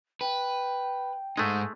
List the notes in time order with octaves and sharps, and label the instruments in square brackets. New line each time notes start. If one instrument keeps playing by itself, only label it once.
[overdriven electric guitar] B4 [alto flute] G5
[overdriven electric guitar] G#2 D#4 [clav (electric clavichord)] G#3 A3